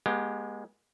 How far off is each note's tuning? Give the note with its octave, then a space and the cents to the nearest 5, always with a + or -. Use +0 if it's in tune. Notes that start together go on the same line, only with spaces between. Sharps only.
G#3 +0 B3 -45 G4 +0